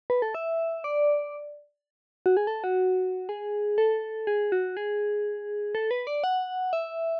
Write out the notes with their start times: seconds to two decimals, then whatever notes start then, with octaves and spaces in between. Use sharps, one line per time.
0.10 B4
0.22 A4
0.35 E5
0.84 D5
2.26 F#4
2.37 G#4
2.47 A4
2.64 F#4
3.29 G#4
3.78 A4
4.27 G#4
4.52 F#4
4.77 G#4
5.75 A4
5.91 B4
6.07 D5
6.24 F#5
6.73 E5